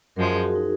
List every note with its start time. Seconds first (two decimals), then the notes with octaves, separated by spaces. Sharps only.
0.16 F#2 F3 G#3 A#4
0.30 G#4
0.43 F#4
0.56 D#4